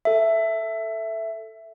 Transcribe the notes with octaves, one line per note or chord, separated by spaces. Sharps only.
A4 E5